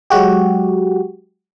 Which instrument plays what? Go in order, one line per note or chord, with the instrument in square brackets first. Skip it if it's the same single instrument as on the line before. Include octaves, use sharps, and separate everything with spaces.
[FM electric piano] F#3 G#3 F#4 G4